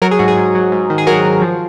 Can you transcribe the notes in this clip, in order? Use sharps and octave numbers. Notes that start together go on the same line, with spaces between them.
F#3 F#4 A#4
G#4
G#2 F#4
G#4
G#2
F#3
G#2
D#3
G#4
F#3 F#4 A#4
F#3
F3